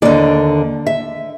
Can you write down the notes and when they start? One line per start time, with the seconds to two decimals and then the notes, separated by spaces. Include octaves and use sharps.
0.02 D#2 D3 D5
0.87 E5